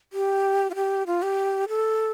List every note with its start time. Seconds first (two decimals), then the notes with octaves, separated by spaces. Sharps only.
0.13 G4
0.70 F4
0.75 G4
1.07 F4
1.22 G4
1.69 A4